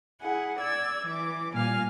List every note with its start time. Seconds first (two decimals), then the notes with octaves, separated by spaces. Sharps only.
0.21 E4 G#4 F#5
0.59 D5 E6 G#6
1.06 E3 D6
1.53 A#2 G3 F5 G#5 F6